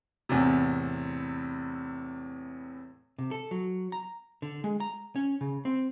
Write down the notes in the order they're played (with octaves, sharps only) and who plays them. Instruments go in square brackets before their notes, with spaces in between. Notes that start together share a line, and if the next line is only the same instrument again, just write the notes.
[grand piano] E2 A2 C3
[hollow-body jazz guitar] C3
A4
F#3
A#5
D3
G#3
A#5
C#4
C#3
C4